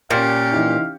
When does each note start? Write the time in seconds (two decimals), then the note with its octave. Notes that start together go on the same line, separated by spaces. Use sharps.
0.10 A#2 C#4 G4 F5 F6 G6 C#7
0.52 E3 D#4 E4